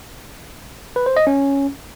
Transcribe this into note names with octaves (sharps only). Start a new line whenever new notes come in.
B4
C5
D#5
C#4